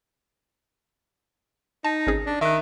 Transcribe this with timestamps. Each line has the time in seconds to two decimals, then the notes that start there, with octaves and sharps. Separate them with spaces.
1.85 D#4 A5
2.07 G#1 C#4 G#4
2.26 D4
2.41 D#3 E5 F#6